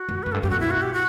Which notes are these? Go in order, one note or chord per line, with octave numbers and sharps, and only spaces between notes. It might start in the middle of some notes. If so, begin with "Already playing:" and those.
Already playing: F#4
F#2
F#2 B4
G2 A4
F#2 G4
B2 F#4
E4
F#4
G4
F#4